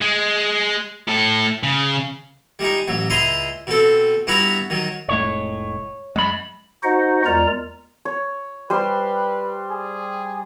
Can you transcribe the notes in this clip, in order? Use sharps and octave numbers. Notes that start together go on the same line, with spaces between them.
G#3
A2 A4
C#3
G3 G#3 D#4
A1 F#3
C#2 E4 D#5 A#5 C6
B2 C4 A4
G2 B3 E4 F#4 A#5 B5
D#3 F#3
F1 A2 G#3 C#5
F#2 G#3 B5
D#4 F#4 C5 D#5 F#5
E2 G#3 F4 A#4 D5 A#5
C#5
G3 B4 C5 C6
G#4